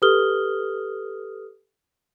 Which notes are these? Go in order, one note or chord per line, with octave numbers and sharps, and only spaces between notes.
G4 A4 B4 D#6 F6 G7